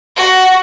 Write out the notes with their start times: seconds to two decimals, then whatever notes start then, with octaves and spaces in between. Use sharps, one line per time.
0.16 F#4